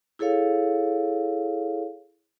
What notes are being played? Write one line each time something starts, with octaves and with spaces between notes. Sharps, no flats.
E4 G#4 A4 C#5 F5